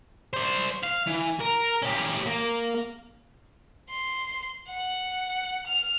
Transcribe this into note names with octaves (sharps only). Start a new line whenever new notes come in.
C5 D5
F5
E3
A#4
C#4 G4
A#3
C6
F#5
F6